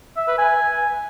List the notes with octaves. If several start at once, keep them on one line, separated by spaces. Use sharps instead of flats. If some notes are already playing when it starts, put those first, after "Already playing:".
E5
B4
G#5